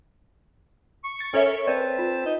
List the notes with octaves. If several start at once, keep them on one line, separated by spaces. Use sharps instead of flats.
C#6
A6 C#7
C#4 A4 A#4 C#5 E5
C4 B4 D5 A5
F4
D#4